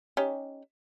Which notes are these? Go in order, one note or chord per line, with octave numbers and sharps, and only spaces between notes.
C#4 D#4 G4